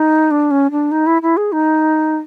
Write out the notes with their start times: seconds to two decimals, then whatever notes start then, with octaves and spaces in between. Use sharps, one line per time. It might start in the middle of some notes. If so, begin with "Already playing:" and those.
Already playing: D#4
0.31 D4
0.51 C#4
0.71 D4
0.91 D#4
1.07 E4
1.22 E4
1.37 G#4
1.52 D#4